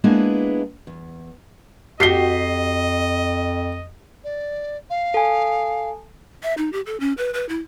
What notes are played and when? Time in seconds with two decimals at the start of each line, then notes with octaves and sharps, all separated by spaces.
0.04 G#3 A#3 B3 D4 E4 G#4
0.87 E2
2.00 F2 F#4 G4 D#5 B6 C7 G7
4.24 D5
4.90 F5
5.14 A4 G#5
6.43 E5
6.58 D#4
6.73 G4
6.86 A4
7.00 C#4
7.17 B4
7.34 B4
7.49 E4